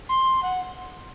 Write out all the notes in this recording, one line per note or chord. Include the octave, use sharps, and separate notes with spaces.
C6
F#5